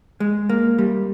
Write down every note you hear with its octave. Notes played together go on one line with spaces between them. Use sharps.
G#3
A#3
G3